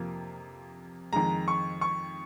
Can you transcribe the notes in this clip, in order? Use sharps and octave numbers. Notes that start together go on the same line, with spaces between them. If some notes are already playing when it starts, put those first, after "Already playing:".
Already playing: F2 C3 F3 A#3
F2 D#3 G#3 A#5
C#6
C#6